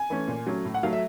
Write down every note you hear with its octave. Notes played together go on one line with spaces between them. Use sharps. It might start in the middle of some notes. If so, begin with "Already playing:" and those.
Already playing: G#5
E3 A3 C#4
A#2
F#3 A3 C#4
A2
F#5
F#3 A3 F5
E5